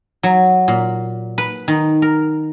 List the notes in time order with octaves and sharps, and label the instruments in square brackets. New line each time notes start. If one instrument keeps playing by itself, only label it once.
[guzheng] F#3
A#2
B4
D#3
A#4